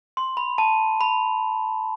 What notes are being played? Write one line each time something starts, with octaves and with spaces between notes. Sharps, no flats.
C6
B5
A5
B5